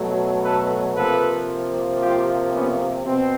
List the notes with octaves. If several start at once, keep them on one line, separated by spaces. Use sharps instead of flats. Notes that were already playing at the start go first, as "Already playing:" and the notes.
Already playing: B2 F#3 A3
A4 B4
C3 F3 A#3 A4 B4
F4 G4
B3 C#4
B2 C4